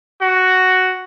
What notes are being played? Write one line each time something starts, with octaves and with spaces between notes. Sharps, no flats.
F#4